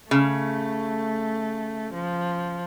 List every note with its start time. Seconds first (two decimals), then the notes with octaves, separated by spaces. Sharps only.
0.11 C#3 A3
1.93 F3